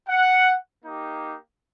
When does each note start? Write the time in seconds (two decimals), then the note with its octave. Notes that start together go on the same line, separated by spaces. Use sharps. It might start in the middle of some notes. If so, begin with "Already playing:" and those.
0.09 F#5
0.84 A#3 D#4 G4